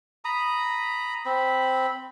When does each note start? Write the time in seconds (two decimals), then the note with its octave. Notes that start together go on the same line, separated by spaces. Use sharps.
0.25 A#5 B5 D#6
1.25 C4 B5